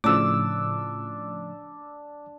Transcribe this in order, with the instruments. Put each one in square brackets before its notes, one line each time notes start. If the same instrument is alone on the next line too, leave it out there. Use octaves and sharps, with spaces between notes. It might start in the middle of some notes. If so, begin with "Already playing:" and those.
[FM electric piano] A2 C#3 F3 [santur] D4 E6 [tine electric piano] D6